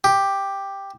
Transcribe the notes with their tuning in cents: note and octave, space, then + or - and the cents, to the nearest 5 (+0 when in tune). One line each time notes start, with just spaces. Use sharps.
G4 +5